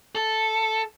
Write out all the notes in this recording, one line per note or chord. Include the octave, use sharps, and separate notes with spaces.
A4